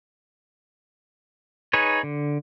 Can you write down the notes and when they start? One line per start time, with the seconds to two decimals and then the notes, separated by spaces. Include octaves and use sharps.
1.73 D#4 G#4 B4 C#5
2.03 D3